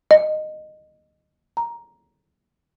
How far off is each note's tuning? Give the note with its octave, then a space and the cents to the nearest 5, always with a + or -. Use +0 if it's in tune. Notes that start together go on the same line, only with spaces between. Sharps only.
D#5 -15
A#5 +10